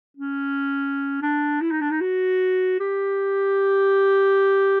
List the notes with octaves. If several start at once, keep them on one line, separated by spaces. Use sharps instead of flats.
C#4
D4
E4
D#4
D4
D#4
F#4
G4